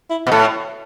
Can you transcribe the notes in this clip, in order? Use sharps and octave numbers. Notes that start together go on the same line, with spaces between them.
E4
B2
A2 A4